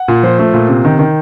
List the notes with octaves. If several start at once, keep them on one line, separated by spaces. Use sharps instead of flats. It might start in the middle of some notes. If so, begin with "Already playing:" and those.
Already playing: F#5
A#2
F3 C5
A3
A#2
C3
D#3
D#3